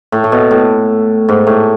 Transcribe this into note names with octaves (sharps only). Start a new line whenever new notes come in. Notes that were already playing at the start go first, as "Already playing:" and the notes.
A2
A2
B2
A2
G#2
A2